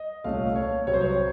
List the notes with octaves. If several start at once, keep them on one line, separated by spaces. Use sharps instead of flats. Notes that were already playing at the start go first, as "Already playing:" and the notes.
Already playing: D#5
C2 A#2 A3 C#4 F5
C#5
C2 C3 F#3 C4 C#5
C5
C#5